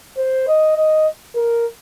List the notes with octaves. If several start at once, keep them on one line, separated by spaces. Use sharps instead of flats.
C5
D#5
D#5
A#4